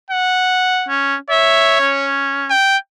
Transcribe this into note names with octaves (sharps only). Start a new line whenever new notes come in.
F#5
C#4
C#5 E5
C#4
G5